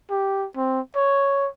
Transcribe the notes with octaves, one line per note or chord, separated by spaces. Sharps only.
G4
C4
C#5